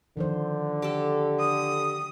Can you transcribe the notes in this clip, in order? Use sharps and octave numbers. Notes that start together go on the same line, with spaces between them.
D3 D#3 F3 C5
G4 A4
D#6